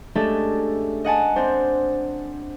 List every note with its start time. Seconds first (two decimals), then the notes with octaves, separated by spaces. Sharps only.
0.15 G#3 A3 C#4 D4 G4 A4
1.04 D#5 F#5 G#5 A5
1.36 C4 D4 C5